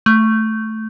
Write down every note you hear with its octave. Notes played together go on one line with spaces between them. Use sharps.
A3